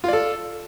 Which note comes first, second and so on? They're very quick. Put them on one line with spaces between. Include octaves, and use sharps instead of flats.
F4 D5 A4